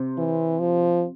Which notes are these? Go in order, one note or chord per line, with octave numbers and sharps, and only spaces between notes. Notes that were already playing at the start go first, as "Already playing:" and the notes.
Already playing: C3
E3
F3